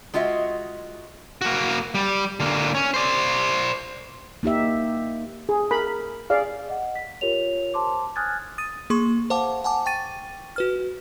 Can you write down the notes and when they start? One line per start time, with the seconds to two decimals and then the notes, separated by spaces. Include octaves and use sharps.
0.14 G#3 F4 F#4 D#5 E5
1.41 A#3 F#4
1.94 G3
2.40 D3 A#3
2.75 C#4
2.94 C5 D5
4.43 A#3 D#4 G4 E5
5.49 G#4
5.71 A#4 B5
6.30 G#4 D5 F5
6.68 D#5 F#5
6.95 B6
7.21 F4 G4 A#4 C#5 F7
7.74 C5 A5 C6 D6
8.16 G#5 D#6 F6 F#6 G#6 A6
8.58 D#6 A6 D#7
8.90 A#3 G#4 C6 C#6
9.30 C5 F5 F#5 A5 D6
9.64 F#5 G#5 A5 D6
9.86 G5 C#6 A6 D#7
10.56 F#4 B4 F6